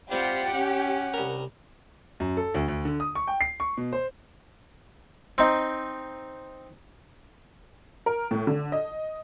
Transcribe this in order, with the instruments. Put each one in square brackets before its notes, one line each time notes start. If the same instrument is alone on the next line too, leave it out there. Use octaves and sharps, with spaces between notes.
[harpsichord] G3 [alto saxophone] C4 [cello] F4 F#5 [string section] G4
[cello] C#4 [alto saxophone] F#5
[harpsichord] C2 A#4
[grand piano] F#2
A4
D2
D2
D3
D#6
C#6
G5
C7
C#6
B2
C5
[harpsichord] C4 D#4
[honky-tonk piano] A#4
A2
D3
D#5